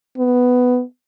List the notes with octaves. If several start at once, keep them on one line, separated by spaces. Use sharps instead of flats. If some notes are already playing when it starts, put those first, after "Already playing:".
B3